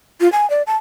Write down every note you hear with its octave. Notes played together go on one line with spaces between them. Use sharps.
F4
G#5
D5
A5